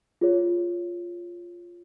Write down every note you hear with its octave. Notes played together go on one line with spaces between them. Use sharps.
F4 G#4 C#5